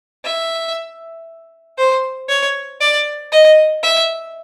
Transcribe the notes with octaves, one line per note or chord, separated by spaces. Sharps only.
E5
C5
C#5
D5
D#5
E5